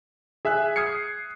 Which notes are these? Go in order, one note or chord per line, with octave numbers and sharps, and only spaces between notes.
G#4 E5 G#5 F#6
D#6 F6 G#6 C7 C#7